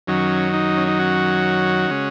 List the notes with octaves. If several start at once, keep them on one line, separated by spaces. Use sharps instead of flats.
F#2 D#3 F#3 C#4
D#4
C#4
D#4
C#4 F#4
C#3 G#3